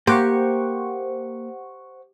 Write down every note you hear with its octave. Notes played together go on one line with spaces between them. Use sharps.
A#3 G4 C5 F#5 C#6